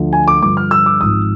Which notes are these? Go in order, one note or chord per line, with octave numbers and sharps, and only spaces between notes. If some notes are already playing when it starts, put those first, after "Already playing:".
Already playing: D2 D3 F3
G#5
D6
G2 D3 F3 D6
F6
E6
D6
G#1 G#2 F3 D#6